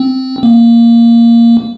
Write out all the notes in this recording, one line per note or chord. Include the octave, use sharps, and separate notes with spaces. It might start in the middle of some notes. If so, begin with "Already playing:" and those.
Already playing: C4
A#3